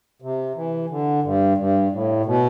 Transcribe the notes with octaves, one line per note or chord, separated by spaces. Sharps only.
C3
E3
D3
G2
G2
A2
B2